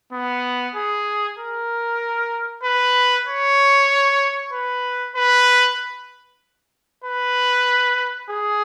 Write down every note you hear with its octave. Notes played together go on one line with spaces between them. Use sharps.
B3
G#4
A#4
B4
C#5
B4
B4
B4
G#4